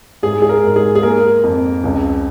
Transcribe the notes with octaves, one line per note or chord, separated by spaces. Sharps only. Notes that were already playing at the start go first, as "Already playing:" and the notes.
G#2 G#4
G#4
A#4
G#2
G#4
G#4
A#3 A#4
F2
C#2